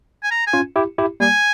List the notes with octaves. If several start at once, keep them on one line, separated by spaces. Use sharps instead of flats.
G#5
A#5
G#5
C#4 F4
E4 G4
E4 G4
G3 A#3 G#5